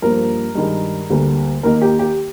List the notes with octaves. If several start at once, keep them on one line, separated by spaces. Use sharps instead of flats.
G2 F3 A#3 A#4
G2 D#3 G#3
D2 D3 G3 A#3
D#2 D#3 A#3 A#4
G4
G4